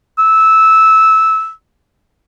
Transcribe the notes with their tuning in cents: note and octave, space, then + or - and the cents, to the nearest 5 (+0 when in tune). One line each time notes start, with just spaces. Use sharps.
E6 -15